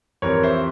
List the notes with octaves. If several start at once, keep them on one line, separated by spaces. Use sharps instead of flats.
F2 E3 G3 C4 A#4 C#5
C5 E5